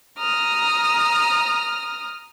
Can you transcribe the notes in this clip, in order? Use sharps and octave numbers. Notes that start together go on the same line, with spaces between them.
A#5 D#6 F6